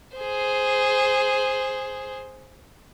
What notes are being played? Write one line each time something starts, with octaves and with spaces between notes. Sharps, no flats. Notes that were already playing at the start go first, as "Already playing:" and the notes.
G#4 C5